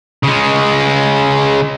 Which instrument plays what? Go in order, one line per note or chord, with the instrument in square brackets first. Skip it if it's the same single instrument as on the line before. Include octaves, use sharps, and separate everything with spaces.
[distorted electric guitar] C#3 G#3